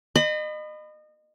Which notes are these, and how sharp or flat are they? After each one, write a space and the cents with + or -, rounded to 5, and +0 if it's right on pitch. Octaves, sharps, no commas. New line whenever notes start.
D#5 -30 B5 +25